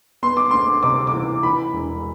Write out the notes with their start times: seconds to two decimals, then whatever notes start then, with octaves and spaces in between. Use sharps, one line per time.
0.23 B3 C6
0.37 D6
0.51 D2 C6
0.83 C3 D6
1.07 D6
1.14 E3
1.43 E3 B5
1.73 E1